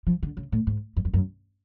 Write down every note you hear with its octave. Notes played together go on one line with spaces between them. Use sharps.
F3
D3
C#3
A2
G#2
F#2
F2
F#2